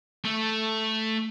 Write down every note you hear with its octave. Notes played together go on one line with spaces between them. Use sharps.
A3